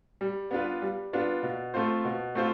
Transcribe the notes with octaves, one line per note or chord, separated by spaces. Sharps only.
G3
B3 D4 F4 B4
G3
B3 D4 F4 B4
B2
A3 C4 F4 C5
B2
A3 C4 F4 C5